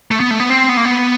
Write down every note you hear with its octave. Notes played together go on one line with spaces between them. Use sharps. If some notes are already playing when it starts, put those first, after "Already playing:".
A3
B3
A3
B3
C4
B3
A#3
B3